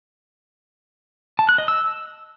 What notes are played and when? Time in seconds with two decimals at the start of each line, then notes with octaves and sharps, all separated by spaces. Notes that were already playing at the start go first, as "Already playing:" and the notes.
1.39 A5
1.49 F#6
1.58 D#5
1.68 E6